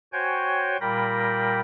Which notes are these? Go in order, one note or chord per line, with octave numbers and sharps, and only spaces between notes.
F#4 C5 C#5 G5 G#5 G6
A#2 G3 A#4 G5 B5 A#6